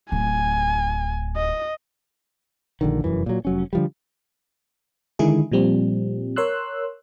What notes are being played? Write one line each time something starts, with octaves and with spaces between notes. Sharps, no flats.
D1 G#5
D#5
A#1 D3 D#3
F1 A#1 F#2 E3
A#2 F#3
F1 F#3 C#4
D3 F3 G3
D3 D#3 G#3 D#4 E4 G#4
A#2 F3 G3 C4
A#4 C#5 C6 E6 F#6